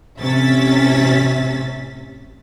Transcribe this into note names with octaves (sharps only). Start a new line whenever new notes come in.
A1 C3 C#4 E5 A6 B6